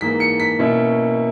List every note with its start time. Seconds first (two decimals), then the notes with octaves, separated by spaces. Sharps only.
0.01 G#2 E3 A#3 B6
0.20 C#7
0.40 B6
0.59 B2 A#3 C#4 E4